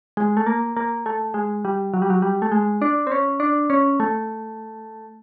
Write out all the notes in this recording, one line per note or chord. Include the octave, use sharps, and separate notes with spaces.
G#3
A3
A#3
A#3
A3
G#3
G3
F#3
G3
F#3
G3
A3
G#3
D4
C4
C#4
D4
C#4
A3